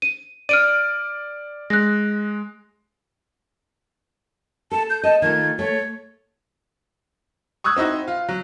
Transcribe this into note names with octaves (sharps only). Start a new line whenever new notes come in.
D#7
D5 F6 D7 D#7
G#3 F#6 A#6
A4 A5
G6
D#5 A5
D#3 A3 F4 G#6
A3 C#5
C#6 D#6 E6 F#6 G#6
C4 D#4 E4 F#4
F4
F#3